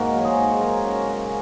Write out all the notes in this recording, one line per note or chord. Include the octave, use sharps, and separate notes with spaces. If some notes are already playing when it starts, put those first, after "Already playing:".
Already playing: G#2 A#3 F#4 A#4
F#3
C#5
G#4 C5
G#2
F#3 A#4 C#5
C#4
C#3